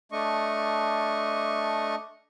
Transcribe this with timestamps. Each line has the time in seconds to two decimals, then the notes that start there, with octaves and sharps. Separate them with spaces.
0.12 A3 D4 D#5 C#6